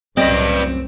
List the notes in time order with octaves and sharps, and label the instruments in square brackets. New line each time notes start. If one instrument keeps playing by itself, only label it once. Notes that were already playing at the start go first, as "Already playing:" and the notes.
[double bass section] C2 F#2 A2 [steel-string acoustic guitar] C4 [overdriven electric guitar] B4 D5 [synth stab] D#5 A#6